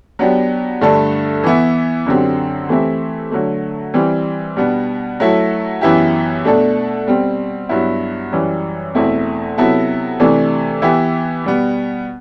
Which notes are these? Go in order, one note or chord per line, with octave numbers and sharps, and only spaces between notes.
F#3 B3 D4 G4
G2 D3 A3 D4 A4
E3 B3 E4
F#2 D3 F#3 C4 G4
E3 A3 C4 E4 G4
D3 F#3 A3
E3 G3 C4
B2 G3 B3 D4
F#3 A3 E4 A4
F#2 E3 B3 E4 G4
B2 A3 D4 A4
B2 G3 C4
G2 F#3 B3 E4
F#2 E3 G3
E2 B2 A3 C4 E4
C3 F#3 B3 E4 A4
C3 E3 A3 D4
E3 B3 E4 G4
B2 G3 B3